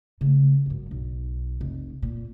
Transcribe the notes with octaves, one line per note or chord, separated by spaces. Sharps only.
C#3 A3
G#1 F#2
B1
F1
A#2